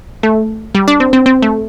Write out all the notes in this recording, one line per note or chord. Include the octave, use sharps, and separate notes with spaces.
A3
G3
D4
C4
C4
C4
A3